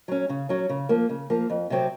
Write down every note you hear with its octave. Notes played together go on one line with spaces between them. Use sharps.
F#3 C#4
C#3
F#3 C#4
C#3
F3 A#3
C#3
F3 A#3
F2
C3 F#3 C4